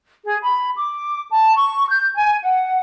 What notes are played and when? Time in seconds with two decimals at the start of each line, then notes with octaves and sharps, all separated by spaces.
0.24 G#4
0.42 B5
0.76 D6
1.31 A5
1.56 C#6
1.89 G6
2.14 G#5
2.43 F#5